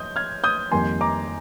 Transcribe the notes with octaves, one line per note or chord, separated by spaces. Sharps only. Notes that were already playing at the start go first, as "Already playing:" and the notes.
Already playing: D#6 G6
F6 G#6
D#6 G6
F2 D#3 G3 A#3 G#5 C6
A#5 D6